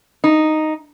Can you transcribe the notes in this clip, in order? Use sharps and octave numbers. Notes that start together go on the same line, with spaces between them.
D#4